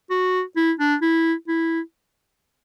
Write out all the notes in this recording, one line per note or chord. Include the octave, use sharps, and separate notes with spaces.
F#4
E4
D4
E4
E4